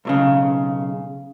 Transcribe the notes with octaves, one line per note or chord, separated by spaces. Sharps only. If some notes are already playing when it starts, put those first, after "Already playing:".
B1 A2 C#3